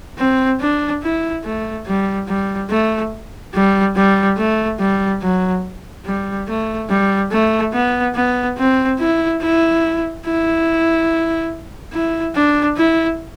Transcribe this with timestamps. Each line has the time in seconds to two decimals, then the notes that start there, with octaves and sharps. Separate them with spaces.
0.18 C4
0.60 D4
1.02 E4
1.44 A3
1.86 G3
2.28 G3
2.70 A3
3.54 G3
3.96 G3
4.37 A3
4.79 G3
5.22 F#3
6.05 G3
6.48 A3
6.89 G3
7.31 A3
7.73 B3
8.15 B3
8.58 C4
8.99 E4
9.41 E4
10.25 E4
11.93 E4
12.35 D4
12.77 E4